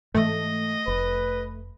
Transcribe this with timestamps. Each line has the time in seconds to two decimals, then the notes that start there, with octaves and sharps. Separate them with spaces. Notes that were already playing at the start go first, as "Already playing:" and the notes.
0.14 G#2 E3 A3 D#5
0.87 F1 B4